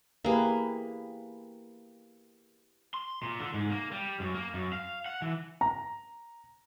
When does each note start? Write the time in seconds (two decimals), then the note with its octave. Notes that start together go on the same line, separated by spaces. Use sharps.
0.25 A#3 E4 G4 G#4 B4
2.94 C6
3.23 A#2
3.40 D3
3.54 G#2
3.70 A#3
3.92 G3
4.20 F#2
4.34 A#3
4.54 F#2
4.73 F5
5.06 F#5
5.22 E3
5.61 A#5